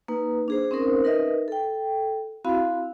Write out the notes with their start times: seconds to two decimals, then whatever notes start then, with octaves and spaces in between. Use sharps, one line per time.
0.08 A#3 D#4 B4
0.48 D4 G#4 C5
0.71 C4 C#4 D#4 A#4 C5
1.04 D#4 A#4 B4 D#5 E5
1.48 A4 G5
2.45 C4 E4 F#4 F5 B5